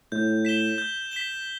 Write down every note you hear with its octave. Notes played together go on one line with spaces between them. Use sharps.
A2 G6
B6 E7 G7
G6
B6 E7 G7